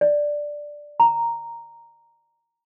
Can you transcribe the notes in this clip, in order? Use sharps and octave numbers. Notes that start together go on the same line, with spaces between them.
D5
A#5